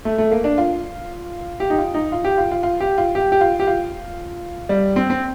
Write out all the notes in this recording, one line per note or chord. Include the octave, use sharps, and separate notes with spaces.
A3
A3
A#3
D4
F4
G4
D#4
F4
D#4
F4
G4
F4
F4
F4
G4
F4
G4
G4
F4
G4
F4
G3
C4
C4